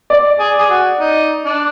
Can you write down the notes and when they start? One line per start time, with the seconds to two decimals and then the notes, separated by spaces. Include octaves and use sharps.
0.10 D5
0.39 G#4
0.58 G#4
0.69 F#4
1.00 D#4
1.45 D4